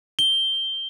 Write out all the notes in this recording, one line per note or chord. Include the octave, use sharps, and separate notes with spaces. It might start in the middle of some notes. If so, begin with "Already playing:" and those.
G7